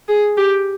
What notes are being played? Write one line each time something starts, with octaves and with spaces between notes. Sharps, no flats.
G#4
G4